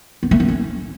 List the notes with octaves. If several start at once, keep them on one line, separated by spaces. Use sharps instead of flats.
B3
A3
B3
C#4